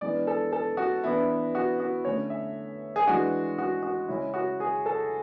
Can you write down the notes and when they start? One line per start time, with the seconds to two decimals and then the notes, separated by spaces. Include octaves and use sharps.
0.01 E3 G#3 B3 D4 D5
0.27 A4
0.52 A4
0.77 F#4
1.03 E3 B3 D4 E4
1.55 F#4
1.80 F#4
2.05 D3 A3 C#4 C#5
2.30 E5
2.96 G#4
3.07 E3 G#3 D4 F#4
3.58 F#4
3.83 F#4
4.09 C#3 G#3 C#4 E4
4.34 F#4
4.60 G#4
4.86 A4